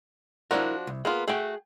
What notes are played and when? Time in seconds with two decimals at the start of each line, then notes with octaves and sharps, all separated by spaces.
0.51 F3 D4 E4 F#4 A#4
0.87 C2
1.05 A#3 B3 F4 G#4
1.28 A3 F#4 G#4 F#5 G5